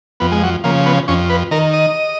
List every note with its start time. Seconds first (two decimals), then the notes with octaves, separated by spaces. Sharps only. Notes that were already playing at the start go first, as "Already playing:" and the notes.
0.20 F2 B3
0.32 G#3
0.43 F#3
0.64 C#3 F3 A#3
0.86 B3
1.08 F2 C#4
1.30 B4
1.51 D#3 A#4
1.73 D#5